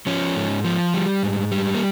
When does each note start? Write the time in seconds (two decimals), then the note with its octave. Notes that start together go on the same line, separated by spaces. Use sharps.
0.07 F3 C#4
0.36 G#2
0.64 F3
0.94 G3
1.23 G#2
1.52 G3
1.74 A#3